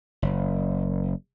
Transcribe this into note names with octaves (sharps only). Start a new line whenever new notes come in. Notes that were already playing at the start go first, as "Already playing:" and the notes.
F#1